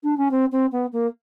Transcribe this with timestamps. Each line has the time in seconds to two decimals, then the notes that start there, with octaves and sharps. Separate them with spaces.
0.03 D4
0.17 C#4
0.31 C4
0.52 C4
0.72 B3
0.92 A#3